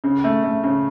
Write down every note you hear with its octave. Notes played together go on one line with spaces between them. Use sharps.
C#3
A3
A3
C#3